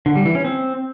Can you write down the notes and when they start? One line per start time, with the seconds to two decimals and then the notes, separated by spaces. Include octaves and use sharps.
0.06 D3
0.16 G3
0.25 E3
0.35 C#4
0.45 C4